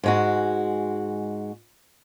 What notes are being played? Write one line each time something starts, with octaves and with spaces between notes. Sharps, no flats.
G#2 G#3 F#4